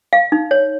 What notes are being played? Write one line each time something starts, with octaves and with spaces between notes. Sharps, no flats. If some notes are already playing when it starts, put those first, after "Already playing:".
F5
D#4
C#5